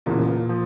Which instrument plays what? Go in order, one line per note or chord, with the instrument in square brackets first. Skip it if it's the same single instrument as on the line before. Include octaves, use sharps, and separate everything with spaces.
[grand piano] E1 E2 C#3 E3 [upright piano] A#2
[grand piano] F3